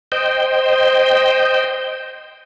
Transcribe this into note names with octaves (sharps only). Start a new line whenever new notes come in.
C5 D#5 G5